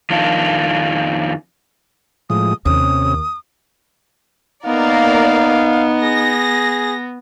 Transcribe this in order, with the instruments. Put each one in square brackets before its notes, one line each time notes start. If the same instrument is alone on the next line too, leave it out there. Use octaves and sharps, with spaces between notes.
[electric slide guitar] F2 D#3 D4 F4
[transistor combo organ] A2 F3 G#3 [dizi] D#6
[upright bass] D#2 [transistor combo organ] C3 C#4 [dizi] D#6
[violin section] A#3 A#4 D5 [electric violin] B3 [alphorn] D#4 [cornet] F5
[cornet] G#4 [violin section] A#6